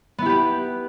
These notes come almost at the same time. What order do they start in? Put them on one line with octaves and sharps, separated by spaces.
B3 E4 G4 B4